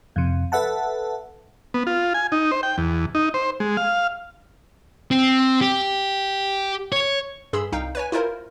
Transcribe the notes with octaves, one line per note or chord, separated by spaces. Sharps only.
F2 C3
A4 B4 E5 F#5 A5
B3
F4
G#5
D#4
C5
G5
E2
D#4
C5
G#3
F5
C4
G4
C#5
G2 G#4 B5 C6 E6
C2 D#4 F5 G5
B4 C#5 G#5
E4 F4 A#4 C5